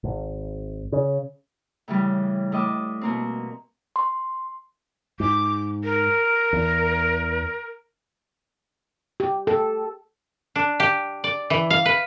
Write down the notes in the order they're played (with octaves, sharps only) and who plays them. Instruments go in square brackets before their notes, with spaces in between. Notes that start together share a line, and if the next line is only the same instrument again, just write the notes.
[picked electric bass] G#1
C#3
[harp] A2 C#3 E3 G3
A2 D#5 D6 E6
B2 A#3 C4
[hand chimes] C6
[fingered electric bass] G#2 [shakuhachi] D6
[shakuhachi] A#4
[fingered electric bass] E2
[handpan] G4
A4
[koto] D4
G4
D5
E3
F5
B4